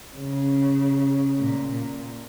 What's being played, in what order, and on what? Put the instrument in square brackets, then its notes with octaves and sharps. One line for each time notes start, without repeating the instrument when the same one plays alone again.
[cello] C#3
A#2
A#2